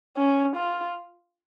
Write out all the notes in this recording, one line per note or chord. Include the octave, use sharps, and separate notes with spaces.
C#4
F4